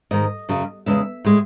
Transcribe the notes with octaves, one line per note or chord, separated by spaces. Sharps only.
G#2 D#3 G#3 D#5
F#2 C#3 F#3
E2 C#3 G#3 E5
A2 G#3